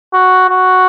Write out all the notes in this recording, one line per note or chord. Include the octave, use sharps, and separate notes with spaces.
F#4
F#4